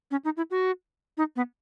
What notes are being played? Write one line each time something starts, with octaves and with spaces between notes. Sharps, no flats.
C#4
D#4
E4
F#4
D#4
B3